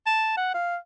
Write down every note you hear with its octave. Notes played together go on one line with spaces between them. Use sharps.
A5
F#5
F5